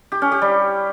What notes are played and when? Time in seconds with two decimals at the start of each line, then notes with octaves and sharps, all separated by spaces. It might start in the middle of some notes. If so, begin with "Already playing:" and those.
0.12 G4
0.22 C#4
0.32 G4
0.42 G3